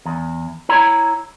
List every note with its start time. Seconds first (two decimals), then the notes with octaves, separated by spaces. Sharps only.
0.06 E2
0.69 E4 C#5 A#5